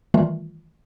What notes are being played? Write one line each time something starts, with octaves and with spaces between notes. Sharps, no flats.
D#3 E3 G3 A3 F4